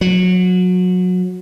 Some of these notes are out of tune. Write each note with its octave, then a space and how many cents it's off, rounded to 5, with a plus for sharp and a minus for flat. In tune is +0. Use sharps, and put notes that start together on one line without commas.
F#3 -25